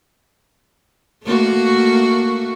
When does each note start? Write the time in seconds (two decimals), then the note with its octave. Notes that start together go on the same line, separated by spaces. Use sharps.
1.23 A3 A#3 F#4